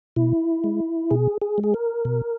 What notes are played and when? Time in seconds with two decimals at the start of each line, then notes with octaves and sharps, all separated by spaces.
0.16 B2 E4
0.64 G#3
1.11 B2 G#4
1.42 G#4
1.58 G#3
1.64 G#4
1.74 A#4
2.05 B2